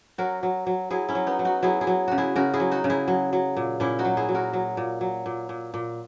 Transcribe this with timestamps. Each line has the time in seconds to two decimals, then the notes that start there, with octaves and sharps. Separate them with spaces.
0.18 F#3 F#4 A#4
0.43 F#3
0.67 F#3
0.90 F#3 E4 G#4
1.09 C#4 E4
1.15 F#3
1.27 B3 D#4
1.39 F#3
1.45 D#4 F#4
1.63 F#3 E4 G#4
1.81 E4 G#4
1.87 F#3
2.08 C#3 F#4
2.18 E4 G#4
2.36 C#3 F#4 A#4
2.54 E4 G#4
2.60 F#3
2.71 D#4 F#4
2.84 C#3
2.90 E4 G#4
3.08 F#3
3.33 F#3
3.57 A#2
3.80 A#2 C#4 E4
3.99 D#4 F#4
4.05 F#3
4.17 E4 G#4
4.29 F#3
4.34 F#4 A#4
4.53 F#3
4.77 A#2
5.01 F#3
5.26 A#2
5.49 A#2
5.74 A#2